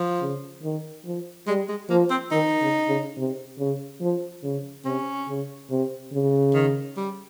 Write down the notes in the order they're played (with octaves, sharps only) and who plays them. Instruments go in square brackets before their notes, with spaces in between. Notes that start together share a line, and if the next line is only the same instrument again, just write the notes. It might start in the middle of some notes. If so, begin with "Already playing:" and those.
Already playing: [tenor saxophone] F3
[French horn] C#3
D#3
F3
[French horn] G3 [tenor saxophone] G#3
[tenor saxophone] G#3
[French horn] F3 [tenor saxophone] A#3
[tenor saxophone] C4
[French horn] D#3 [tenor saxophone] D#4
[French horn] C#3
C#3
C3
C#3
F3
C#3
[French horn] C3 [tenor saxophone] C#4
[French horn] C#3
C3
C#3
[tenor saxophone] D#3
G3